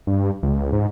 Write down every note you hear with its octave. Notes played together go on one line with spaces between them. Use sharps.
G2
C#2
G#2